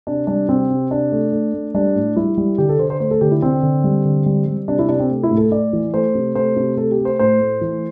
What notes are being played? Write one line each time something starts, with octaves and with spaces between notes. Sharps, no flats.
C3 D4
G3 D4
C3 C4
C3
C3 D4
A3
A3
A3
G3 D4
A2
G3 E4
G3
D3 G4
A4
D3 C5
C5
A3 C5
A4
D3 G4
E4
D3 C4
D3
G3
D3
G3
G3
C3 D4
E4
C3 D4
C4
A3
E4
A2
A4
A2 D5
E3
A3 C5
C3
A3 C5
C3
A3 A4
G4
A3
C5
A2 C5
A3
E3